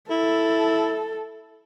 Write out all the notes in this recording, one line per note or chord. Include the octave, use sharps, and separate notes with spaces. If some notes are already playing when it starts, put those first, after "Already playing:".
E4 A4